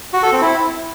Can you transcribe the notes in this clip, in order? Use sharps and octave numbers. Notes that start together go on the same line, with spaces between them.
F#4
A4
C4
E4